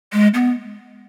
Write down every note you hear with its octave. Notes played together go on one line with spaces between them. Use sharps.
G#3
B3